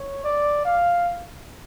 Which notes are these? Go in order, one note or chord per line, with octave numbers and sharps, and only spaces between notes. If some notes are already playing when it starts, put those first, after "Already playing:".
Already playing: C#5
D5
F5